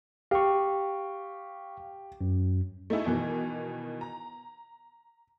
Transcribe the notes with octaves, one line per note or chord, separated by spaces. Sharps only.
G4 F5 C#6
F#2
A3 D#4 E4 G#4
B2 D#3 E3
A#5